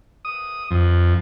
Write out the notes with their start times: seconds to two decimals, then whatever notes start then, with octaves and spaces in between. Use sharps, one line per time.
0.25 D#6
0.71 F2